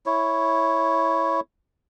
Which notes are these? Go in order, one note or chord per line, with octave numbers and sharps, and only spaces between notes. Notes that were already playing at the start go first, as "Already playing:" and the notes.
E4 C#5